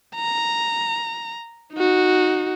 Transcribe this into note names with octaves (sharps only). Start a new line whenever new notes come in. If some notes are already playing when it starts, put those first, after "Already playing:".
A#5
D#4 F#4